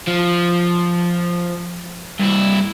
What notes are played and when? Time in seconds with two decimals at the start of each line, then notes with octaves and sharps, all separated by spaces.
0.08 F3
2.20 G2 E4